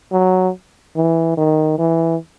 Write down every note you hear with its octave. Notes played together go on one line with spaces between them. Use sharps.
F#3
E3
D#3
E3